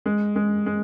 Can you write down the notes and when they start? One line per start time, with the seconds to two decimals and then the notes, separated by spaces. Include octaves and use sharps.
0.06 G#3
0.36 G#3
0.66 G#3